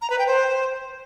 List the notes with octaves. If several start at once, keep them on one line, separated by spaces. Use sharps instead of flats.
A#5
B4
G5
C5